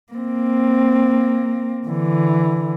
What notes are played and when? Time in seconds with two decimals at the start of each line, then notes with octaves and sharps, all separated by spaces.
0.13 A#3 C4
1.87 D3 E3